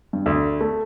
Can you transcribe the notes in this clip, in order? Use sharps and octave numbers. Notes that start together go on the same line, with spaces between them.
G2
D2
A3